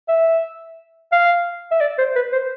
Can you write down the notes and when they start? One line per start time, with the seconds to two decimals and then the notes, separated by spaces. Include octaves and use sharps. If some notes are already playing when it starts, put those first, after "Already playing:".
0.09 E5
1.12 F5
1.71 E5
1.81 D5
1.98 C5
2.15 B4
2.32 C5